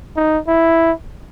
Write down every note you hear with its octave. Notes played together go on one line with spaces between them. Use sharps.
D#4
E4